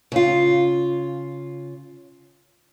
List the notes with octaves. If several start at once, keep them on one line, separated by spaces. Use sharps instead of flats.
C#3 F4